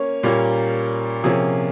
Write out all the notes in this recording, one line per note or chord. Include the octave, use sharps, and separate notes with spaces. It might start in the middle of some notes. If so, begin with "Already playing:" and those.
Already playing: A#3 C#4 C#5
A#2 G3 A#3 C#4
C3 F3 A#3 C#4 G#4